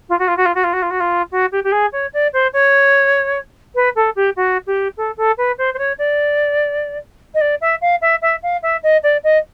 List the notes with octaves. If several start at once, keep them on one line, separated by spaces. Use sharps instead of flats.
F4
F#4
F4
F#4
F4
F#4
F4
F#4
F4
F#4
F4
F#4
G4
G4
G#4
C#5
D5
C5
C#5
B4
A4
G4
F#4
G4
A4
A4
B4
C5
C5
C#5
D5
D#5
D5
E5
F5
E5
E5
F5
E5
D#5
D5
D#5